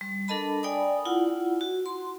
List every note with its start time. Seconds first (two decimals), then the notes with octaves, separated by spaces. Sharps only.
0.01 G3
0.28 D4 A4 A#4 D#5 A5 B5
0.63 D5 G5 G#5 B5 D#6
1.05 E4 F4 F#5
1.61 F#4
1.86 C6